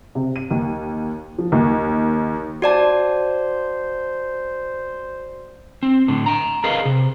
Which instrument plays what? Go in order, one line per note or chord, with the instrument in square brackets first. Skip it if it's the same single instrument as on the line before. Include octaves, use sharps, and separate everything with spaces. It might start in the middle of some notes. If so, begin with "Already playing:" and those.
[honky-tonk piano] C3
D#7
D#2
F3
D#2
[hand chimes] F#4 D5 A5 [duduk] C5
[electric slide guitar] C4
A2 D3
G5 A#5
G#4 A#4 B4 D#5 F5
C3